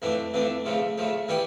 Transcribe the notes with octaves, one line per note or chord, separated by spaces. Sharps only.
F2 E3 A3 D4
F2 E3 A3 D4
C#3 F3 A3
C#3 F3 A3
E3 G3 C#4 G4 D5